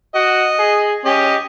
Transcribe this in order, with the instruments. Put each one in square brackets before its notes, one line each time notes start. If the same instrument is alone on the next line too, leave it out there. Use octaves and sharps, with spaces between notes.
[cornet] F#4 [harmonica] D#5
[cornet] G#4
[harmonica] C#4 D#5 [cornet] G4